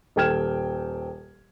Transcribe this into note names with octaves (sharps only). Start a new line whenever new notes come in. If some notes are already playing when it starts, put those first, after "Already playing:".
D#1 A4 G5 F6 G#6 E7